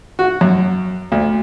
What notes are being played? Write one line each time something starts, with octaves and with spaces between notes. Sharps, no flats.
F#4
F#2
D2